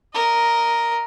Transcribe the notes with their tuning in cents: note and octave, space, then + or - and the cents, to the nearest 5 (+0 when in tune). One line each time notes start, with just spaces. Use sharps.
A#4 +0 D#5 +0